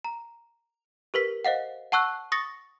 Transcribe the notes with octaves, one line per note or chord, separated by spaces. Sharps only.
A#5
G4 A#4 B4 B6
C5 D#5 F5 F#5
F#5 A5 C#6 E6 F#6
C#6 D#6 A6 A#6 C#7